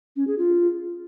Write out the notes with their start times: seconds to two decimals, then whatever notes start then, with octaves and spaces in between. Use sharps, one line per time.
0.16 C#4
0.27 G#4
0.38 F4